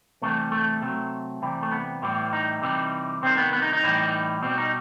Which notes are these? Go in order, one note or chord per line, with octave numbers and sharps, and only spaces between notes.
C3 E3 G3 A3
A3
C3 F#3 A3
C3 E3 G3
A3
B3
A2 E3 G3
D#4
C3 E3 G3
C3 D#3 G3 C4
B3
B3
D#4
D#4
A2 E3 G3
B2 G3 C4
D#4